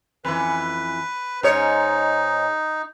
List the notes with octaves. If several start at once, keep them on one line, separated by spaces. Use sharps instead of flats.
F2 E3 B4
G#2 D#4 C#5